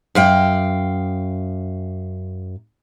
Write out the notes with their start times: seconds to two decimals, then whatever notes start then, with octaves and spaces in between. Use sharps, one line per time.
0.15 F#2 F5 G5